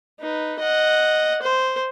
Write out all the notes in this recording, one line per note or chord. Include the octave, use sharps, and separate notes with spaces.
D#4 B4
D#5 F#5
C5